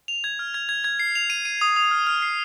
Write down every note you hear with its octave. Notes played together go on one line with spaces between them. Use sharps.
F7
G#6
F6
G#6
G#6
G#6
C7
F7
D#7
D#7
D#6
D#6
F6
F6
C7